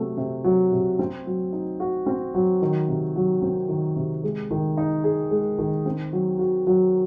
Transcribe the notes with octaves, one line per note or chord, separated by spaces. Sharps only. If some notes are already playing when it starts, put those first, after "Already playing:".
Already playing: C3 F#3 A3
C3
F#3
C3
C4
F#3
D#4
F#4
C4
F#3
D#3
C3
F#3
C4
D#3
C3
G#3
D#3
D#4
G#4
G#3
D#3
C4
F#3
F#4
F#3